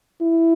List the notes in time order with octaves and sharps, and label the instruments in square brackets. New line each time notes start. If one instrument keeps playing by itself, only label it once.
[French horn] E4